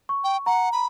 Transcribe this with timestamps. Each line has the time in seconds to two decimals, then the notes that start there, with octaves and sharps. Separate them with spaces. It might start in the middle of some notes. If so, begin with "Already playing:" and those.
0.09 C#6
0.24 G5
0.46 F#5 A#5
0.73 B5